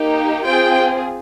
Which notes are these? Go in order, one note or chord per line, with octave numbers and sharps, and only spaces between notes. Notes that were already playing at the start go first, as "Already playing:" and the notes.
Already playing: A#3 D#4 G4
C4 F4 G#4 G5